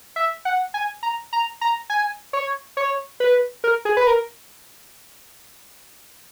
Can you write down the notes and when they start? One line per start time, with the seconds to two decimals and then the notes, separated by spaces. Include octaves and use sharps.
0.16 E5
0.45 F#5
0.74 G#5
1.03 A#5
1.33 A#5
1.61 A#5
1.90 G#5
2.33 C#5
2.77 C#5
3.20 B4
3.64 A#4
3.85 G#4
3.97 B4
4.07 A#4